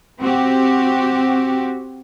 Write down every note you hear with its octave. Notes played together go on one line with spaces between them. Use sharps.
C4 F#4 G4